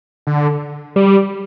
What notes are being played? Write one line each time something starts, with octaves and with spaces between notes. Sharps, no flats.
D3
G3